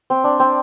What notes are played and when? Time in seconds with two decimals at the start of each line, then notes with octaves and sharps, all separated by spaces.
0.10 C4
0.24 D4
0.40 C4